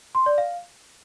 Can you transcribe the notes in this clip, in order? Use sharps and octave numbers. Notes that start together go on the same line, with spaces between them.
C6
D5
F5